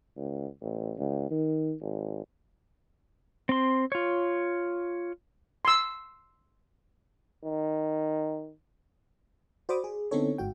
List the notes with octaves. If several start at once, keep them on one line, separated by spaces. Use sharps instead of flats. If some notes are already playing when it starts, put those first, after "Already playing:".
C#2
A1
C#2
D#3
G#1
C4 C6
F4 C#5
C6 E6
D#3
F#4 C5 D5 B5 D6 D#6
G#4
D3 B3 C4 D#4 A4 C#5
G1 G#2 F#4 G5